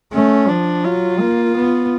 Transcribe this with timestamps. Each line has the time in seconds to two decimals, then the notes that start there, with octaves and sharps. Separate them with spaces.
0.12 A3 C#4
0.48 F3 D4
0.84 F#3 F4
1.20 A#3
1.56 B3